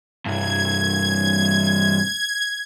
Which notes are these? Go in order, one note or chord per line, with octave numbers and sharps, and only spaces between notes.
C2 G2 G#6